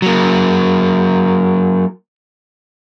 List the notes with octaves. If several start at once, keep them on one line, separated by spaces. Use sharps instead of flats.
F#3 A#3